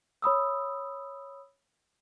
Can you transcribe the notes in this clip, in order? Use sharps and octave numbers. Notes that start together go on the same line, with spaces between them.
C#5 B5 D#6 E6